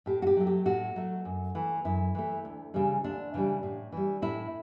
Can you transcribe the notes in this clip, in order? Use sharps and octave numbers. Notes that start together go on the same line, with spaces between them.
A2 G4
F#4
G4
F#3 A3
G4
A2 F#4
F#3 A3
F#2
E3 A3
F#2 E4
E3 A3
D2
C#3 E3 G3
D2 D4
C#3 E3 G3
A2
E3 G3
A2 E4